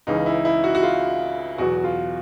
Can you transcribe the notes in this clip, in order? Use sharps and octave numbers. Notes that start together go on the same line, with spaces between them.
C#2 C#3 E3 D#4
E4
E4
F#4
F#4
F4
E2 B2 F#3 F#4
F4